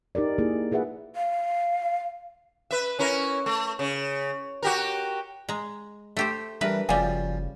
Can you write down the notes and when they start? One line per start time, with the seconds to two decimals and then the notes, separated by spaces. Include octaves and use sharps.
0.15 D#4 G4 A#4 D5
0.38 A#3 D#4 E4 G#4
0.72 F4 G#4 B4 E5 F#5
1.16 F5
2.71 B4 E5
2.99 C#4 E4 A#4
3.46 A3
3.79 C#3
4.62 F#4 G4 A#4
5.49 G#3 A#5
6.17 A3 G4 C5
6.61 E3 G3 D4 G4 A#4 B4
6.89 F#1 C#3 F3 G3 F#4 D5 G#5